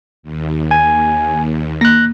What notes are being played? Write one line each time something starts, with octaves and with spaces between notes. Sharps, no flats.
D#2
G#5
A#3 F#6 A#6